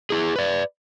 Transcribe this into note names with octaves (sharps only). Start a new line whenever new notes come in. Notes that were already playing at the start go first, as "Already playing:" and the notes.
E4 G#4
B4 D5